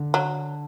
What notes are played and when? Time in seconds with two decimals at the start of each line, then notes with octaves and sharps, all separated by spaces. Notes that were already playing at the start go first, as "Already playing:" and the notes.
Already playing: D3
0.14 F#3